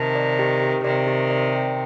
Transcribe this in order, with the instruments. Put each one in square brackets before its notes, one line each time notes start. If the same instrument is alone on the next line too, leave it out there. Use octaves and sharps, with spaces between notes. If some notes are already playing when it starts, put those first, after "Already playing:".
Already playing: [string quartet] C3 D#3 [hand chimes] A5
[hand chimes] D5
G4
G4
[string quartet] C3 D#3 [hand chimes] D5
[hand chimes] G4
D5
G5